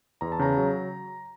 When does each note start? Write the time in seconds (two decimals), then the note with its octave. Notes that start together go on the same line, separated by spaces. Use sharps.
0.21 E2 A#5
0.32 A5
0.39 C#3 A#5
0.58 F#3